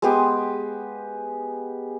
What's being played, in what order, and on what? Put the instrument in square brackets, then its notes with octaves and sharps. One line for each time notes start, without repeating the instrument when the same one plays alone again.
[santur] G#3 B3 G4